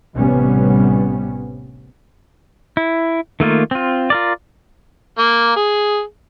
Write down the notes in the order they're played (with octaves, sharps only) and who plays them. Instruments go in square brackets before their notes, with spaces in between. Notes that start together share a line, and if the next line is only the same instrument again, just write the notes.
[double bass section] A1 C3 G3 B3 C#4
[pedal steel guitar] E4
D#3 A3 A#3 F4
C4 F4
F4 A#4 D5
[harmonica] A#3
G#4